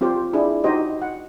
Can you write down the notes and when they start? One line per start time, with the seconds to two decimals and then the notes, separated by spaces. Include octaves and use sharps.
0.01 C4 F4 G4 C5
0.33 D4 E4 G#4
0.64 D#4 F#4 G4 C5 D#5
1.02 F#5